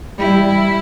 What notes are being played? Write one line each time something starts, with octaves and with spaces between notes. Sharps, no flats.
G3 E4